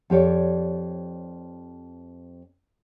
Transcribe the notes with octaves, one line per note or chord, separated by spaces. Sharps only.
F2 G4 C#5 D5